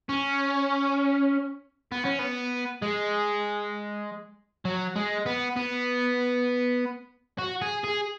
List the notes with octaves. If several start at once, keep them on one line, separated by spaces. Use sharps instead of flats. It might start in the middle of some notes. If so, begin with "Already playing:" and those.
C#4
B3
C#4
B3
G#3
F#3
G#3
B3
B3
F#4
G#4
G#4